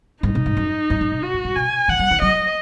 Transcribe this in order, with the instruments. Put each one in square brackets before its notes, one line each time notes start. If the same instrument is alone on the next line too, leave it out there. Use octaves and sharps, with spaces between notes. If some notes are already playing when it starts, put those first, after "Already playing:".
[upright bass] G#2 [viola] D#4
[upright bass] B2
G#2
F#2
F#2
G#2
B2
[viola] F#4
[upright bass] G#2
G#2
[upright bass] B2 [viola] G#5
[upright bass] D#3 [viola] F#5
[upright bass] F#3
D#3
[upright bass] F#3 [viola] D#5